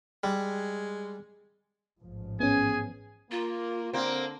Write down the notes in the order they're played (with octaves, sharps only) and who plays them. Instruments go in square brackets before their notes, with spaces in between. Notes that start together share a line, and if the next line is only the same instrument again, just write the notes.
[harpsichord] G3 [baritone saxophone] G#3
[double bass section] A1 G#2 F3
[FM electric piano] B3 C#4 [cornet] G#4 [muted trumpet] G#5
[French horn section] A#3 [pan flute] F4
[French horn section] D3 [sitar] A#3 C4